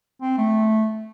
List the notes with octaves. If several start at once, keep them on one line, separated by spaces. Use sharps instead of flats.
C4
A3